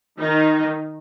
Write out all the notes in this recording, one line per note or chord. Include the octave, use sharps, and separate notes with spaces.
D#3 D#4